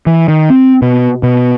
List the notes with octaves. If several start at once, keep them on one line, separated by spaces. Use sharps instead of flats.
E3
D#3
C4
B2
B2